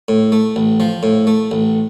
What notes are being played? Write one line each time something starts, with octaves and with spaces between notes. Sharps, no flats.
A2
A3
A1
F3
A2
A3
A1